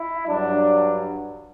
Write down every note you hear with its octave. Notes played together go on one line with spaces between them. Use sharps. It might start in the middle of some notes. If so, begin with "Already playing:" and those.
Already playing: E4
G2 F#3 D4